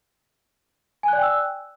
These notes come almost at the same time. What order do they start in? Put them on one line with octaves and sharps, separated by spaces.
G#5 F#6 D5 G5 E6